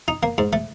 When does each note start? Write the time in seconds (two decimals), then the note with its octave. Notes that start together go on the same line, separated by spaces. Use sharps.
0.08 D#4
0.23 A#3
0.38 G#2
0.53 A3